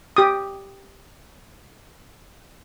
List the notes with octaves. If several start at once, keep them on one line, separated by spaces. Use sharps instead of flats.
G4 D#6